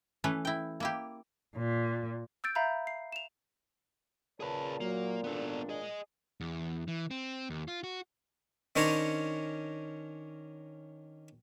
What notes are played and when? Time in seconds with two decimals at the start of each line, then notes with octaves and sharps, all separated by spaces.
0.24 E3 A3 C#4 B4
0.45 E4 G5
0.80 A#3 E4 G4
1.56 A#2
2.44 E6 G6 A6 D7
2.55 E5 F5 A#5 B5 G6
2.87 C7
3.12 E7 F7
4.40 A#2 C#3 G#4 B4 C#5 A5
4.81 F#3 A#3
5.24 G#1 B2 B3 D4 A4
5.69 G#4 D#5
6.41 E2
6.88 E3
7.11 C4
7.50 D#2
7.68 F4
7.84 F#4
8.76 D#3 C#4 D4 C5 C#5 A#5